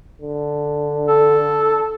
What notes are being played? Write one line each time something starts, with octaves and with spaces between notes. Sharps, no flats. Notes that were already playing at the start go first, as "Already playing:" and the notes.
D3
A4